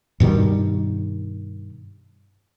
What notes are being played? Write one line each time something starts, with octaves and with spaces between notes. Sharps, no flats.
G2 B2 D#3 G3